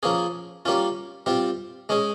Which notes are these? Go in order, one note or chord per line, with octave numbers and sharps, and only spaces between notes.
F3 A#3 C#4 G#4
G3 A#3 C#4 F4
G3 C4 F4
G#3 C#4 G#4